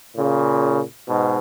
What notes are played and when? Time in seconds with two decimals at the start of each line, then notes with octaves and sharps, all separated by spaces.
0.16 A#2 C#3
1.07 G#2 B2